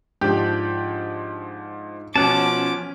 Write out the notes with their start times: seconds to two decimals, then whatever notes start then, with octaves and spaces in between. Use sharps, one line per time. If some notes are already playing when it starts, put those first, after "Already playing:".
0.21 G#2 F3 D4 G4
2.15 B2 F3 C#4 F#5 A5 D6